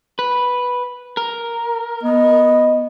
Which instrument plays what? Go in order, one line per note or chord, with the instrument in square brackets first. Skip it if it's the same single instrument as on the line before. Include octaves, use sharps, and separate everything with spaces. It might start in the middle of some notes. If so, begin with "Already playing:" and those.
[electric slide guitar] B4
A#4
[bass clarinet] B3 [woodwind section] D#5